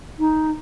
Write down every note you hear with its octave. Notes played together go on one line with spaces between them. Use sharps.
D#4